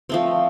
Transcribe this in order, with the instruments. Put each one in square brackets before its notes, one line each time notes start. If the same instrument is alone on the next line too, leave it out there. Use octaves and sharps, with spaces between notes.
[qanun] F3 A3 C4